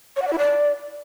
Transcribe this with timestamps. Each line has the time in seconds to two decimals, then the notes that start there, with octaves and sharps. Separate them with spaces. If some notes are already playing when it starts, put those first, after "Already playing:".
0.16 C#5
0.22 F#5
0.27 D5
0.33 E4
0.38 D5